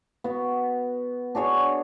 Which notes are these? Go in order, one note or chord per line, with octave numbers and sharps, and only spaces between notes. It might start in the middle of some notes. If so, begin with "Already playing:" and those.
B3 F#4
D4 F#4 G#4 C#5